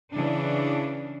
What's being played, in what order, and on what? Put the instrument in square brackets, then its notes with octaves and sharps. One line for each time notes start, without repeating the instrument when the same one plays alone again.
[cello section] C#3 E3 D4